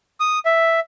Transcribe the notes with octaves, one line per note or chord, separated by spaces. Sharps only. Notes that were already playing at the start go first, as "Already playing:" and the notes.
D#6
E5